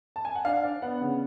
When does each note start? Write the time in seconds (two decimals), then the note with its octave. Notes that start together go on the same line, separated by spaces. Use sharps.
0.16 A5
0.25 G#5
0.35 F#5
0.45 D4 F5
0.63 D4 D5
0.82 B3 F#5
1.01 C#3